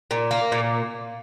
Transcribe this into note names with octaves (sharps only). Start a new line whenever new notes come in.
A#2
A#3
A#2